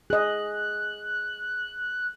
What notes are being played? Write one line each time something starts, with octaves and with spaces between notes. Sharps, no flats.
G#4 D#5 F#6